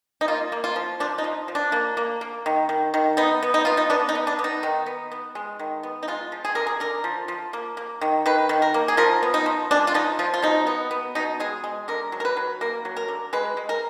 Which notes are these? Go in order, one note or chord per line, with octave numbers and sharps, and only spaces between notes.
D#4
A#3 F4
A#3
F4
F3
F3 D4
D#4
F3
F3
D4
A#3
A#3
A#3
D#3
D#3
D#3
B3 D#4
B3
D#4
B3 F4
D#4
B3 D4
D#4
B3
D4
B3
D#4
D#3
B3
B3
G#3
D#3
B3
D#4
G#3 F4
F3
G#4
D3 A#4
G#4
D3 A#4
F3
F3
A#3
A#3
D#3
D#3 B4
D#3
A#4
A#3
G#4
F3 A#4
B3
D#4
F3
G#3 D4
F4
F3 D#4
F3 F4
F4
B2 D#4
B3
B3
B2 D#4
G#3 G#4
G#3
D3 A#4
F#3
A#4
B4
F#3
A#3 A#4
F#3
A#4
D3
G#3 B4
G#3
A#4